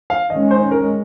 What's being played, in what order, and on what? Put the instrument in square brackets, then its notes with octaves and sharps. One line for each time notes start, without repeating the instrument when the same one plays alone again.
[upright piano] F5
[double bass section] D#3 G#3 C#4 [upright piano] D#5
[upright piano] C5
A#4